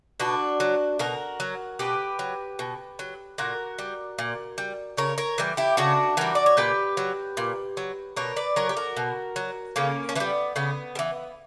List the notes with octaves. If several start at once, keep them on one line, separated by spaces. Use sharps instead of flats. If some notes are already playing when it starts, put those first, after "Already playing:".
B2 D4 F#4
F#3
B2 F#4 A#4
F#3
B2 G4 B4
F#3
B2
F#3
A#2 F#4 A#4
G3
A#2
G3
C#3 A#4 C#5
A#4 C#5
E3 G3
E4 G4
C#3 D4 F#4
E3 G3 F#4 A#4
D5
C#5
A#2 G4 B4
F#3
A#2
F#3
B2 A#4 C#5
B4 D5
F#3 A#4 C#5
G4
F#4 A#4
B2
F#3
C#3 A#3 C#4
C#4
E3 G3 B3
C#3 B3
G3
E3